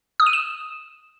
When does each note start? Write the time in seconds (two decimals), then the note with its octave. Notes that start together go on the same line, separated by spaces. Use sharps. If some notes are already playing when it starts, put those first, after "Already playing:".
0.20 D#6
0.26 D#7
0.33 E7